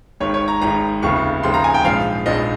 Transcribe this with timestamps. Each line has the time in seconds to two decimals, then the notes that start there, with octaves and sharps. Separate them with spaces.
0.20 G#1 G#2 D#3 C#5
0.34 C#5
0.48 A#5
0.62 G#1 G#2 D#3 A#5
1.02 F1 D#2 C#3 F3 C#6
1.43 F1 D#2 C#3 F3 C6
1.54 A#5
1.64 G#5
1.74 G5
1.85 A#1 G#2 F3 F5
2.26 A#1 G#2 F3 D#5